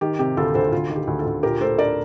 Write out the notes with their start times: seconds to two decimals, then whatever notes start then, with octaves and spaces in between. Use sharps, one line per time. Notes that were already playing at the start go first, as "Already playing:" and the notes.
0.01 D#3 G4
0.19 C3 G4
0.37 D2 F4 A4
0.55 D2 A4 C5
0.72 D2 F4
0.90 D#3
0.96 G4
1.07 D2
1.19 F4 A4
1.26 D2
1.43 A#2 G4 A#4
1.61 A3 A4 C5
1.78 D4 A#4 D5